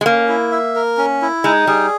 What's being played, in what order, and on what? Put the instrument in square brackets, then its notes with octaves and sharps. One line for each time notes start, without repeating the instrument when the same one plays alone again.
[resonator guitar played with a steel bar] G#3
[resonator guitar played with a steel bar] A#3 [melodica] C#4
[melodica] E4
E5
A#4
C#4
E4
[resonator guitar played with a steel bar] G#3 [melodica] D#4
[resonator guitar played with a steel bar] G3 [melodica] G#4